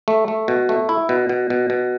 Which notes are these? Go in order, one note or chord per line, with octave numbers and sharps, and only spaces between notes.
A3
A3
B2
A3
E4
B2
B2
B2
B2